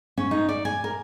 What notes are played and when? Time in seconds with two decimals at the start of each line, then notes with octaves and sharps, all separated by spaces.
0.17 C#4
0.31 D#4
0.49 D5
0.65 G#5
0.84 A#4